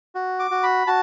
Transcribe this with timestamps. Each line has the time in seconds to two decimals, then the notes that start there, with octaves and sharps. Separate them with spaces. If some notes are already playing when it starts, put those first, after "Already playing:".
0.15 F#4
0.39 D6
0.51 F#4
0.63 B5
0.87 F#4 A5